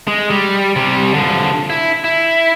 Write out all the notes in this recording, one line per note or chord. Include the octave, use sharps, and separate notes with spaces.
G#3
G3
C3 G3
D3 F3
E4
E4